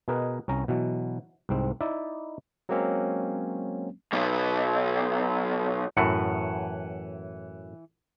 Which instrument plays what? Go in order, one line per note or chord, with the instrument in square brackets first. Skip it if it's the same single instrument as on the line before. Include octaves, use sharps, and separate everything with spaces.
[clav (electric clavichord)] B2 G#4 A#4 B4 D#5
C2 C#4 A#5
B2 E3 F#3
C2 G#2 C4
D#4 E4 D5 E5
[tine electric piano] F#3 G#3 A#3 C4 C#4
[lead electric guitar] B1 B2
[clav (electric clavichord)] F#2 A2 [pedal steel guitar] E3 F#5